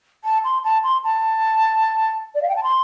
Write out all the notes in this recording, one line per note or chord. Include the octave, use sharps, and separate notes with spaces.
A5
C6
A5
C6
A5
D5
F5
G5
A5
C6